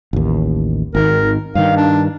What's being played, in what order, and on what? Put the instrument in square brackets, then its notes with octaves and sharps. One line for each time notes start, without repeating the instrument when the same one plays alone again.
[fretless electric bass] A1 D#2
[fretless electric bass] G#1 D#3 [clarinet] A#4
[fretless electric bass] G2 D#3 [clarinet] F5
[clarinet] D4